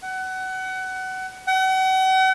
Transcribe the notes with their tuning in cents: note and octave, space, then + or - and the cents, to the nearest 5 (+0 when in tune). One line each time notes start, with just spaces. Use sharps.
F#5 +25
F#5 +40